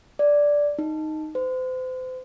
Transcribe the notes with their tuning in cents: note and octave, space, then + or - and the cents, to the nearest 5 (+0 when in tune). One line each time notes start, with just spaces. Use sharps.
D5 -5
D#4 +0
C5 -35